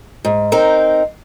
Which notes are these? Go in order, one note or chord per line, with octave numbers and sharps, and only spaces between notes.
G#2
C4 D#4 A#4